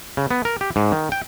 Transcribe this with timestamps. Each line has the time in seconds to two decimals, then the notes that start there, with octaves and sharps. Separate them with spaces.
0.17 C#3
0.31 B3
0.45 A#4
0.61 G4
0.76 G#2
0.92 D#3
1.12 G5